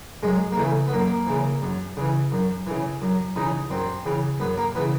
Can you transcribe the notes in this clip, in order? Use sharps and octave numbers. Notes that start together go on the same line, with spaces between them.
F#2 G#3
A#3
C#3 E3 A3
B3
F#2 A#3
C#3 E3
F#2
C#3 E3
F#2
C#3 E3
F#2
C#3 E3 D#4
F#2 C4
C#3 E3
F#2 B3
A#3
C#3 E3 B3